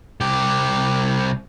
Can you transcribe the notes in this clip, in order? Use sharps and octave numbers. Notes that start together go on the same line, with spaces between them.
C2 G4